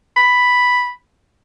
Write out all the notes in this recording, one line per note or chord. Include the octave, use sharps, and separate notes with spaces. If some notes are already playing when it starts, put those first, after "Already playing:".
B5